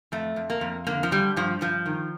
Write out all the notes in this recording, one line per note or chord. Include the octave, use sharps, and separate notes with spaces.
F2 A3
F2
A#3
F2
D3 A#3
F3
D3 G3
G2 F3
G2 F3
D#3